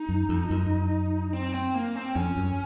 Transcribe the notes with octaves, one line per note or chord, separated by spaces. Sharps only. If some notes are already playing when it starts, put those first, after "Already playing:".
Already playing: D#4
F#2
F2
F#2
C4
C4
A#3
C4
F2 C#4
F#2